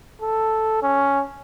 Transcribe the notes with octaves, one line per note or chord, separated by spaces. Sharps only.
A4
C#4